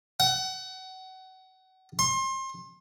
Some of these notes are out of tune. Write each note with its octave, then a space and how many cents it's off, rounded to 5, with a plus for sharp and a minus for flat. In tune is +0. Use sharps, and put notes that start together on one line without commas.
F#5 +30
C6 +30